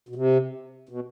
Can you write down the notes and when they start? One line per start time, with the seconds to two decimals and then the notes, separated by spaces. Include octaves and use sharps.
0.09 B2
0.15 C3
0.89 B2